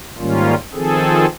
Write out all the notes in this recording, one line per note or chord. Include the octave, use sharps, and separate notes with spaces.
G#2 D#3 G3 A#3 C#4 F4
D#3 F3 C4 G#4 A4